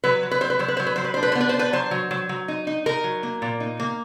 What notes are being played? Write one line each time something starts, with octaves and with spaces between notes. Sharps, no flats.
F#3 B4
F#3
B4
F#3 C5
B4
F#3 C5
B4
F#3 C5
B4
F#3 C5
B4
D4 C5
B4
C5
B3
B4
C5
D4
B4
F#3 C5
F#3
F#3
F#3
D#4
D#4
D#4 A#4
F#3
A#3
A#2
D#4
A#3